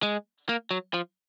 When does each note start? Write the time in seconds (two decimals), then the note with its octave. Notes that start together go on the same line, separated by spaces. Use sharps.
0.03 G#3
0.49 A#3
0.71 F#3
0.94 F3